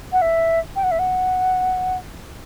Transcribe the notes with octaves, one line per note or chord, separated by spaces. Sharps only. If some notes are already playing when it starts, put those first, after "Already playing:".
F#5
E5
G5
F#5
E5
F#5